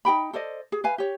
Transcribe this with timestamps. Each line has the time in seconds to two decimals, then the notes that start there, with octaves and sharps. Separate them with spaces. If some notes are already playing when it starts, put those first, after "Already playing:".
0.05 D#4 G#4 G5 B5
0.33 A4 C5 D5 D#5
0.72 G#4
0.84 B4 F5 G#5
0.98 G4 C#5